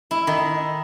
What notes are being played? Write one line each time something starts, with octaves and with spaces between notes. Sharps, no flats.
E4
D#3